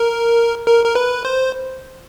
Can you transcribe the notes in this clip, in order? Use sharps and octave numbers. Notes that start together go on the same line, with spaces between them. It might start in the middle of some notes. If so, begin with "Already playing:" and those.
Already playing: A#4
A#4
A#4
B4
C5